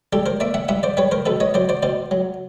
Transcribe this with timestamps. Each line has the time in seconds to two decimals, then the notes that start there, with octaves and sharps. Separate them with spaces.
0.13 G3 G4 A4
0.26 A#4 C5
0.40 A#3 D5 E5
0.54 E5 F#5
0.68 G2 E5 F#5
0.83 C5 D5
0.97 G3 B4 C#5
1.11 A#4 C5
1.26 B2 A4 B4
1.40 C#5 D#5
1.54 F#3 C5 D5
1.69 C5 D5
1.83 B2 C5 D5
2.11 F#3